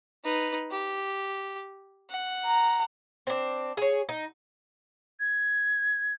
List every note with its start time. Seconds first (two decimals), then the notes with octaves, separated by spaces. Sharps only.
0.24 D#4 B4
0.71 G4
2.10 F#5
2.45 A#5
3.27 C4 D4
3.77 G#4 C#5
4.09 D#4
5.20 G#6